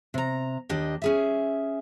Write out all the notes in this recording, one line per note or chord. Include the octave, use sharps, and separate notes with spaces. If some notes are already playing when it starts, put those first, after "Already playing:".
C3 A#5
D#2 D4 G4 D#5
C#4 G#4 E5